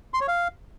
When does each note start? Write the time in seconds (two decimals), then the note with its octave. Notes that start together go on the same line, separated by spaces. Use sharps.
0.14 C6
0.21 C#5
0.28 F5